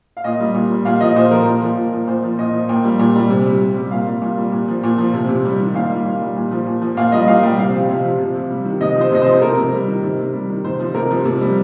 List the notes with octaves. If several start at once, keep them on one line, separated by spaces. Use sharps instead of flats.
F5
A#2 D#5
G3
A#2
G3
A#2 F5
F3 D#5
A#2 C5
F3 A#4
A#2
F3
A#2
F3
A#2 C5
F3
A#2 D#5
F3
A#2 G5
G3
A#2
G3
C3
G3
C3
G3
A#2 F5
G3
A#2
G3
A#2
F3
A#2
F3
C3
C3
G3
D#3
A#2 F5
G3
A#2
G3
A#2
F3
A#2
F3
A#2 F5
G3 D#5
A#2 F5
G3 G5
C3 F5
F3
C3
F3
C3
C3
G3
D#3
C3 D#5
F3 C5
C3 D#5
F3 C5
C3 A#4
C3
G3
D#3
C3
C3
G3
D#3
C3 C5
F3
C3 A#4
F3
C3
G3